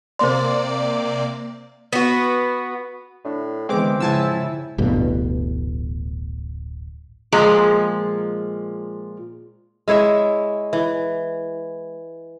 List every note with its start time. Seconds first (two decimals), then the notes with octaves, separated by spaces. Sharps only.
0.19 C3 A#3 C5 D5 C6
1.93 B3 F#4
3.25 A2 D4
3.69 D3 E3 G#3 B3 C4 D6
4.00 F2 G#2 C#3 E4 G#5 A5 E6
4.78 D1 A1 G2 B2
7.32 A#2 F3 G#3 A#5
9.88 G#3 E4 C#5 E5
10.73 E3